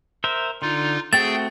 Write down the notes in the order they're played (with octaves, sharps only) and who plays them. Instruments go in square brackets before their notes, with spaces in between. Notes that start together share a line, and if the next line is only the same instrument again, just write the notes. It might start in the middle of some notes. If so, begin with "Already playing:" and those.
[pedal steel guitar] A#4 C5 E5
[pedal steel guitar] D3 [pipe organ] D#4 F4
[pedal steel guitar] A3 C4 F#4 [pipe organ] G#4 G5 [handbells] A6